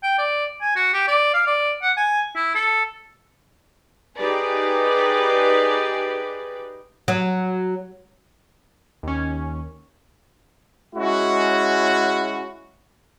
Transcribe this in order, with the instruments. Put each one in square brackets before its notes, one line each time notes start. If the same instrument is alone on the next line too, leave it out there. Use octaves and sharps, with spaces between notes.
[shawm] G5
D5
G#5
F#4
G4
D5
F5
D5
F#5
G#5
E4
A4
[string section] D#4 G4 G#4 B4 D5
[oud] F#3
[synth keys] D#2 C#4
[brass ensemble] G#3 C#4 E4 F#4